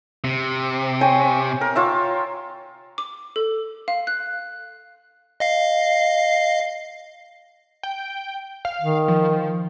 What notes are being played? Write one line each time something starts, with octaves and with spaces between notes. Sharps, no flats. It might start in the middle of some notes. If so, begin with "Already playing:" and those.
C3
C#5 G5 G#5
A#4
F4 C#5 E5
D6
A4
F5
F#6
D#5 F5 C7
G5
F5
D#3
F3